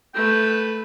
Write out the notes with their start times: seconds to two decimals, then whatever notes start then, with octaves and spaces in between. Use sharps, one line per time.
0.14 A3 B4 G5